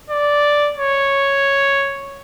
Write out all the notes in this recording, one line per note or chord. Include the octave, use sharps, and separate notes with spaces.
D5
C#5